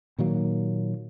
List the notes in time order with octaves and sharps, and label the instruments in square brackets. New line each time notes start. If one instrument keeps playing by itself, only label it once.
[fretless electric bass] A#2 D#3 F#3 A#3